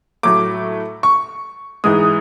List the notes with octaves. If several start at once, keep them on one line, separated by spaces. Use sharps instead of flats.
A2 F#3 A3 D6
C#6
G#2 E3 G#3 D#6